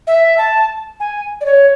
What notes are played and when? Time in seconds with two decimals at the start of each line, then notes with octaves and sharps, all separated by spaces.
0.07 E5
0.38 A5
1.00 G#5
1.41 D5
1.46 C#5